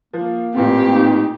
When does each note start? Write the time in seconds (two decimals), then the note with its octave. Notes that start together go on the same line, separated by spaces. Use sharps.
0.13 F3 A#3
0.55 A1 A#2 C4 F4 G4
0.94 D#4